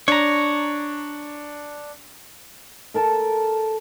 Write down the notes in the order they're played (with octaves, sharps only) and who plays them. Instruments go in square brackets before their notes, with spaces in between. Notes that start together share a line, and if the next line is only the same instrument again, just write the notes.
[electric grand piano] D4 [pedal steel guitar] C#5 A#5
[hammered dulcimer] A4 A#4 A5